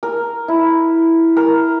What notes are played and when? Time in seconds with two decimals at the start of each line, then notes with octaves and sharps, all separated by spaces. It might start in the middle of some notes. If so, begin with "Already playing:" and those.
0.03 A#4
0.48 E4
1.37 A#4